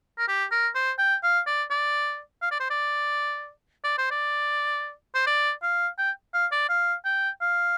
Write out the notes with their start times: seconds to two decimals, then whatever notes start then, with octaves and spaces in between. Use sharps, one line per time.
0.18 A#4
0.28 G4
0.52 A#4
0.75 C5
0.99 G5
1.23 F5
1.47 D5
1.71 D5
2.42 F5
2.51 D5
2.60 C5
2.70 D5
3.84 D5
3.98 C5
4.11 D5
5.15 C5
5.27 D5
5.63 F5
5.98 G5
6.34 F5
6.52 D5
6.69 F5
7.05 G5
7.41 F5